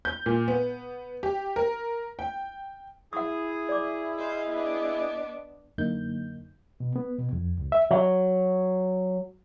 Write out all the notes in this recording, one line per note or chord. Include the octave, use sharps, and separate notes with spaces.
G6
A#2
B3
G4
A#4
G5
E4 G#4 F#5 D#6
D5 D6
C5 D#5 F5
B3 D4
F#2 D3 A#3 D#4 G6
B2
B3
B2
F2
C#2
E5
F#3